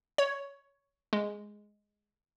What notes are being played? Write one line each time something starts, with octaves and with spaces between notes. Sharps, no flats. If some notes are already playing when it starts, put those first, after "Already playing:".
C#5
G#3